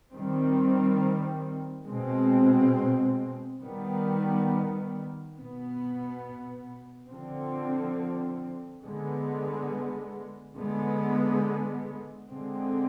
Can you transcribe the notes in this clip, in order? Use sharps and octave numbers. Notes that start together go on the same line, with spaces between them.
D#3 G3 C4
B2 G#3 C4
D#3 G3 B3
B2 B3
D3 F3 C4
D3 G#3 B3
D3 G#3 B3
D3 G#3 C4